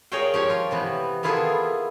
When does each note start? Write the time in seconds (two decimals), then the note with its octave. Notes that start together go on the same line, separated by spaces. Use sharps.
0.12 G#4 A#4 C#5 D5 F5 G5
0.34 F3 G4 C#5
0.50 F4
0.71 C3 E3 B3
1.23 A#3 B3 E4 F4 G#4 A4